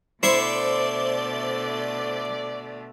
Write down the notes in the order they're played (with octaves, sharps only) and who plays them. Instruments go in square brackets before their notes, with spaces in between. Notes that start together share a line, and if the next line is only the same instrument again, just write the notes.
[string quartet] B2 D3 A3 [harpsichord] E4 C#6 [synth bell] C5 [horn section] D5